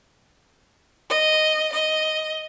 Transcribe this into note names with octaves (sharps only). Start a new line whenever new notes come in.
D#5
D#5